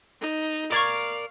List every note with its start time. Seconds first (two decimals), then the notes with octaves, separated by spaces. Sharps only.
0.22 D#4
0.72 A#4 D5 F5 C#6 G#6 A6